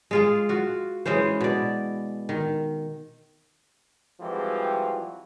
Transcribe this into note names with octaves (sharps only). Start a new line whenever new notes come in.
G#3 F4 G#4
F4 F#4
E3 G#3 C#4 C5
B2 D5
D#3
E3 F3 G3 G#3 C4 F#4